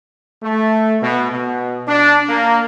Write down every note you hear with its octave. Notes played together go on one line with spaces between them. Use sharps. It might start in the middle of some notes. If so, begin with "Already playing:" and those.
A3
B2
B2
D4
A#3